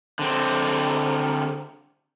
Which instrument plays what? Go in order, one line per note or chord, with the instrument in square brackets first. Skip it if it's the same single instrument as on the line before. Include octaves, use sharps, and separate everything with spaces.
[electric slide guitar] D3 C4